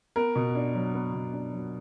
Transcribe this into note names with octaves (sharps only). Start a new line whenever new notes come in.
B3 A#4
B2
D4
F#3
B3
B2
D4
F#3